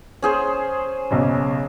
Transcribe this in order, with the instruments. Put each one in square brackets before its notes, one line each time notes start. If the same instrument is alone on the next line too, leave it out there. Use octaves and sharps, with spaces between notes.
[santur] C#4 G#4 C5
[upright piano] B1 C#3